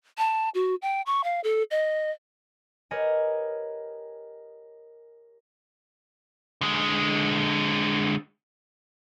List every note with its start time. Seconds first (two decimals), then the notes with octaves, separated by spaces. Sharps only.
0.18 A5
0.55 F#4
0.82 G5
1.06 C#6
1.24 F5
1.44 A4
1.71 D#5
2.91 G4 A#4 B4 C#5 D#5 G#5
6.61 D3 G#3